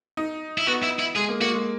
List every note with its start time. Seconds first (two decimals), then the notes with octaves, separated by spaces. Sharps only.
0.17 D#4
0.58 E4
0.67 B3 F#4
0.83 E4
1.00 E4
1.16 G#3 G#4
1.29 A#3
1.41 A#3 F#4
1.54 G#3